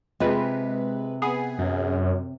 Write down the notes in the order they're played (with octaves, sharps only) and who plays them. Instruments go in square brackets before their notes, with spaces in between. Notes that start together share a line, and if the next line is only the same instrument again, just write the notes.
[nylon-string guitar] C3 C4 F4 [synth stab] G#3 B4
[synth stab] B3 G#4
[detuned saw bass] F#2